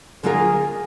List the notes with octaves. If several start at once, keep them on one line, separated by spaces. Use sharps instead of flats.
D3 F#3 A#3 F4 G#4 A#4